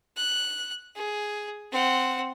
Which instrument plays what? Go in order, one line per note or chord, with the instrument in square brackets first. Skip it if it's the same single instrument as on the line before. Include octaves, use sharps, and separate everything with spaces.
[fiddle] F#6
G#4
C4 F#5